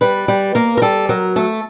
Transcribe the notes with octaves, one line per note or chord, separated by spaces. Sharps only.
G3 B4
G3
A#3 A#4
A#4
G3 A4
F#3 A#4
A3 A4